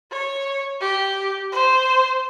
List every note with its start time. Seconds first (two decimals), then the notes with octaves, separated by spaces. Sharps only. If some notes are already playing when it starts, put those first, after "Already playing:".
0.12 C#5
0.81 G4
1.52 C5